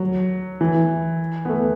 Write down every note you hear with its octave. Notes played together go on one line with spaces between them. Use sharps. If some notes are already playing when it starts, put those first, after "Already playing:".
Already playing: F#3
E3
B3
A3